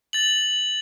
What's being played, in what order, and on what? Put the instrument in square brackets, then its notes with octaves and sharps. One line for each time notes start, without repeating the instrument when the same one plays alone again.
[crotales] A6 F#7